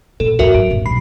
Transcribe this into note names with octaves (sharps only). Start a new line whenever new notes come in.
A#2 A4
D#2 G#2 F#4 A#4 E5
F#2 D7
D#1 G#2
B1 B5 C7